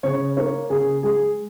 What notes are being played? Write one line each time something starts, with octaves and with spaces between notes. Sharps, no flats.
C#3 C#5
A#3 C#5
C#3 G#4
G#3 G#4